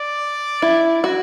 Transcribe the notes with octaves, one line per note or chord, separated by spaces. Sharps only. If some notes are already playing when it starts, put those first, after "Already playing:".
Already playing: D5
E4
F#4